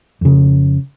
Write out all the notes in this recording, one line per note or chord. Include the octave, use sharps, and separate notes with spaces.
F2 C#3